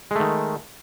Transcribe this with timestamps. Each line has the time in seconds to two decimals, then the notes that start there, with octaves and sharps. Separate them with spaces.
0.11 G#3
0.15 A3
0.20 D#3